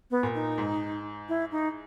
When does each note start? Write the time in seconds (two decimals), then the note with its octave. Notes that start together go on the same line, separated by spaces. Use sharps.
0.11 B3
0.23 A#2
0.34 D#4
0.58 G#2
1.29 E4
1.51 D#4